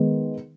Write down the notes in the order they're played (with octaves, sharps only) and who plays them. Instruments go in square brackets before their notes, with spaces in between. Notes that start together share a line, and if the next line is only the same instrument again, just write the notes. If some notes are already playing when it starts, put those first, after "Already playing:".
Already playing: [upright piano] D#3 G#3 B3